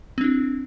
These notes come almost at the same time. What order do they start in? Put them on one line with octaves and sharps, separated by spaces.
C4 D4 E4